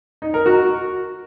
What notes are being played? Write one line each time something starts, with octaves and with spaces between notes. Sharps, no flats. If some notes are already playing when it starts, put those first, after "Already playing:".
D#4
A#4
F#4